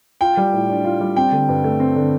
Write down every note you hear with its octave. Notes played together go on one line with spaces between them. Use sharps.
F4 G5
G3
A2
D4
F4
G3
C4 G5
D3
G2
A3
C4
D3